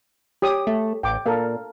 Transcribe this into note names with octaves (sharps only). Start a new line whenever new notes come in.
G4 C#5 D#6
A3
A1 G5 D6
A#2 A4 A#4 F5